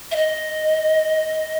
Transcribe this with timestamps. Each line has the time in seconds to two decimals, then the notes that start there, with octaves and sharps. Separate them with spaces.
0.11 E5
0.16 D#5